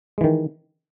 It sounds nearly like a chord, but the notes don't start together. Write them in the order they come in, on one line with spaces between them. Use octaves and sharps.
G#3 E3 D#3